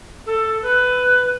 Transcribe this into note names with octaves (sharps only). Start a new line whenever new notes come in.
A4
B4